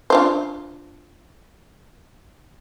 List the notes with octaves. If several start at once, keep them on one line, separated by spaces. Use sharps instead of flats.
D4 F4 C5